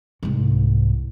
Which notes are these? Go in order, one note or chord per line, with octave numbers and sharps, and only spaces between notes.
C2 G#2